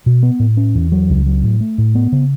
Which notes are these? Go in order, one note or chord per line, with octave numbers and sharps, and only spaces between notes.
B2
B3
A2
C#4
E2
F#3
C#2
F#3
A2
A3
A2
B3
C#3